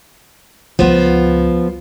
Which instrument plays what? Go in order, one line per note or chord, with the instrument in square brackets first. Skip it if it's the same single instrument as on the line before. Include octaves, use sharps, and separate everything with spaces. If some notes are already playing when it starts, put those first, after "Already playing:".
[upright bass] C#2 F4 [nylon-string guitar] F3 B3